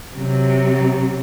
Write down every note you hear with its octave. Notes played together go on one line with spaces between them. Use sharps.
C3 F#3